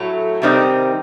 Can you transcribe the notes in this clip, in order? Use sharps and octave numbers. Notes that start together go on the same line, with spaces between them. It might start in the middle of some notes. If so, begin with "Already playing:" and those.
Already playing: A2 F#3 A3
C3 D#3 G3 C4 D#4